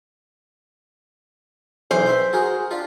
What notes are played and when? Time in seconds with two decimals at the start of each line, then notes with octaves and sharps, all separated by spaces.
1.91 B1 E3 C5
2.06 E5 G5
2.33 F#4 G#4 A#4
2.71 D4 F4 G4